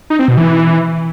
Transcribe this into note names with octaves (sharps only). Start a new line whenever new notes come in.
D#4
C4
B2
E3